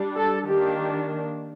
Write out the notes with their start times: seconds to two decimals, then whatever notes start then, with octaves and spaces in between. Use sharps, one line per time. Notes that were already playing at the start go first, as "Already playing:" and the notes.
Already playing: G3 D4
0.17 A4
0.47 D#3 A#3 D4 G4